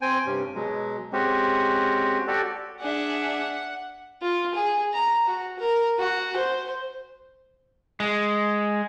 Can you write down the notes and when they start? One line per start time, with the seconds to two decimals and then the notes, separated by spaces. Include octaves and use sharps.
0.01 C4 G5 G#5
0.26 G2 C3 C#4
0.54 B2 F#3 G#3
1.13 G#3 C4 C#4 F#4 G4
2.27 F#4 G4 A4 D5
2.81 D4 G#4 E5 F#5
4.21 F4
4.54 G#4
4.93 A#5
5.27 F#4
5.58 A#4
5.99 F#4
6.36 C5
8.00 G#3